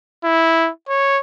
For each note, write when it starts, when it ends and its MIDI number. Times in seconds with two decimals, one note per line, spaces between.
0.24 0.70 64
0.89 1.21 73